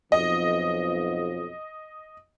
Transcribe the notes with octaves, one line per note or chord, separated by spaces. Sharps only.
B1 F2 D#5